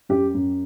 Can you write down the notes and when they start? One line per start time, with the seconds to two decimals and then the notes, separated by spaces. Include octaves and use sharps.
0.09 F#2 G4
0.34 F#2